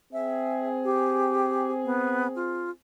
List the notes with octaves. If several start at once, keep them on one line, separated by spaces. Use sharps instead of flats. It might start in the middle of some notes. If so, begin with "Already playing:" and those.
C4 G#4 E5
G4
B3
F4